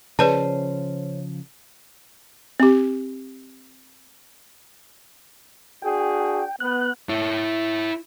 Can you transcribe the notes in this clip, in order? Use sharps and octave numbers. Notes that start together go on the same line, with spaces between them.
C#3 F3 C#4 G#4 B4 C5 D5 A5
C4 G4
D4 F#4 G#4 G5
B3 F#6
E4 C#5